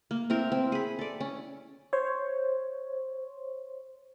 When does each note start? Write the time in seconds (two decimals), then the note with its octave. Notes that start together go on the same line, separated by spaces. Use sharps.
0.11 A#3
0.30 C4 E4 A#4 C6
0.52 C4
0.72 G#4 B5
0.99 A4 D5
1.20 C#4
1.93 C5 C#5